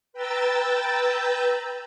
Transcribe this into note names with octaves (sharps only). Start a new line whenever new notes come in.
B4 G5 A#5 E6 G6 A6